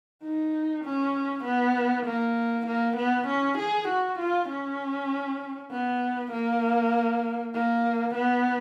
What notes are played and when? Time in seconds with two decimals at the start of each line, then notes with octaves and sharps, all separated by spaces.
0.23 D#4
0.85 C#4
1.45 B3
2.06 A#3
2.67 A#3
2.97 B3
3.28 C#4
3.58 G#4
3.89 F#4
4.19 F4
4.49 C#4
5.71 B3
6.32 A#3
7.54 A#3
8.15 B3